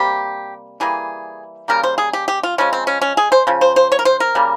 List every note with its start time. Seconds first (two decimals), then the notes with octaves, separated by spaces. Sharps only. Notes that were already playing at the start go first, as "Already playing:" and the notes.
Already playing: C3 G3 A#3 G4
0.80 E3 G3 A#3 G#4
1.68 C#3 G3 A#3 A#4
1.83 C5
1.98 G#4
2.13 G4
2.28 G4
2.43 F4
2.58 C#3 F3 G#3 C#4
2.73 C4
2.87 C#4
3.02 C#4
3.17 G#4
3.32 C5
3.47 C#3 F3
3.61 C5
3.76 C5
3.92 C#5
3.99 A#4
4.05 C5
4.20 A#4
4.35 C#3 G3 A#3